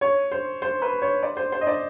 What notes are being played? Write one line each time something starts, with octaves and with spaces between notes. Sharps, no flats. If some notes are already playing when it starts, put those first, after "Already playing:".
C#5
C5
C5
B4
C#5
D5
C5
C5
D#5
D5